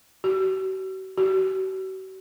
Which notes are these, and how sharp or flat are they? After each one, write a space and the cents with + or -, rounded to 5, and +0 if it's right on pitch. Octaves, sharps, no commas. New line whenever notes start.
F#4 +45
F#4 +45